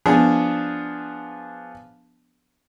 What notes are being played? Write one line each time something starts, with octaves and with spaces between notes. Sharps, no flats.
F3 B3 D4 G#4